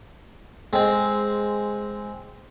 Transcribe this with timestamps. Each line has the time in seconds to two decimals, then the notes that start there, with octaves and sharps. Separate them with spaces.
0.73 G#3 C4